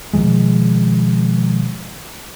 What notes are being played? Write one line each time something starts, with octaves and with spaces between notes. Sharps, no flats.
B2 D#3 F3 G#3